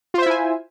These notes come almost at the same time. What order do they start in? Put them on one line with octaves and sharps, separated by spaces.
F4 C5 E5 E4 G#5